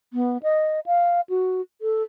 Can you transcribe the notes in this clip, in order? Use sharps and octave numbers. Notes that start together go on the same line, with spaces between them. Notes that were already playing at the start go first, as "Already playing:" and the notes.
B3
D#5
F5
F#4
A4